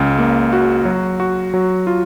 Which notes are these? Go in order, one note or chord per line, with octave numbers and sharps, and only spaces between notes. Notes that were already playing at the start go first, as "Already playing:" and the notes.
Already playing: C#2 C#3
A#3
F#4
F#3
F#4
F#3
F4